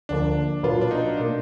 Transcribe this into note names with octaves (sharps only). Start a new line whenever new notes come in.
D2 D3 F3 A#3 D4
B1 A#2 F#3 B3 F4
D4
D#4
B2 A#3 D4